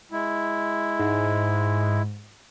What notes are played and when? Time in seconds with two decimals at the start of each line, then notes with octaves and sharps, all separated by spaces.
0.12 G#3 E4
0.99 G#2